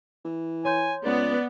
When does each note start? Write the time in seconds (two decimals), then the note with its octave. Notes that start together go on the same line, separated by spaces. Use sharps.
0.25 E3
0.65 C#5 G#5 C6 G6
1.05 C#2 B3 D5